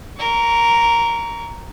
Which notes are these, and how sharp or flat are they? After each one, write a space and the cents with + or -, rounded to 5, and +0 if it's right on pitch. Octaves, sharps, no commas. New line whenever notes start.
A#4 +0 C#6 +35